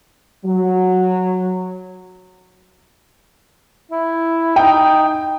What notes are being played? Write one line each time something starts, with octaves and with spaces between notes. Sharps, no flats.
F#3
E4
D#4 G5